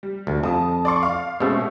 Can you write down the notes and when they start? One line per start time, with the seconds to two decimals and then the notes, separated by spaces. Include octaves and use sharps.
0.03 G3
0.27 D2
0.43 F2 A5 D#6
0.85 D5 C6 C#6
1.03 F5
1.40 B2 G#3 A3 C4 C#4